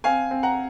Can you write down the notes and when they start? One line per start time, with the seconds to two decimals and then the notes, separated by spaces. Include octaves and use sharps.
0.04 C4 F5 G#5
0.31 C4
0.43 F#5 A#5